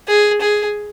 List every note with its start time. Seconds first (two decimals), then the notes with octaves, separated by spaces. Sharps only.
0.08 G#4
0.41 G#4